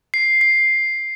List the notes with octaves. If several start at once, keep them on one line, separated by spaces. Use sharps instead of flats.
C7
C7